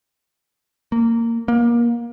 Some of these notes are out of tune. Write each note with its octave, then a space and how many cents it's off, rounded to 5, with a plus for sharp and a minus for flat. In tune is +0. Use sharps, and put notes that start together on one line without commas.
A#3 -15
A#3 +25